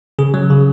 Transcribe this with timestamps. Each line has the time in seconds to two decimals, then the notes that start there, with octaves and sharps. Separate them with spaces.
0.19 C#3 G#4
0.34 F#3
0.50 C#3